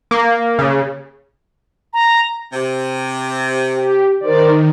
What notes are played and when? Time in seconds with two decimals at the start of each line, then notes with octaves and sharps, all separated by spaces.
0.11 A#3
0.59 C#3
1.93 A#5
2.53 C3
3.76 G4
4.21 D#3 A#4 C5 D5